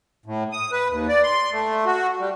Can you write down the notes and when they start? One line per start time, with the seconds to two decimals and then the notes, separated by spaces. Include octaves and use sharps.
0.26 A2
0.52 D#6
0.72 B4
0.89 D#2
1.08 D5
1.23 C6
1.52 A3
1.86 F#4
2.19 G3